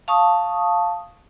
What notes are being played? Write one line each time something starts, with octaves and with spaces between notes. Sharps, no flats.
F5 A5 C#6 D#6